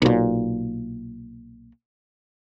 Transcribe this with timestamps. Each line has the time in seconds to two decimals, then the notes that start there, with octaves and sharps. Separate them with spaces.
0.02 B1 A#2